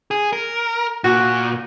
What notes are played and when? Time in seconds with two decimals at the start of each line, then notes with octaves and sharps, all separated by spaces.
0.11 G#4
0.33 A#4
1.04 A#2 F#4